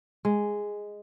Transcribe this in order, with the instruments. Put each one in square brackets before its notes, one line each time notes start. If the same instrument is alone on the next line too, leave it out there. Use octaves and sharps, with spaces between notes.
[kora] G#3